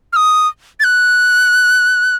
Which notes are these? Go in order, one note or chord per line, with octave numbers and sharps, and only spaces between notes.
F6
D#6
A6
F#6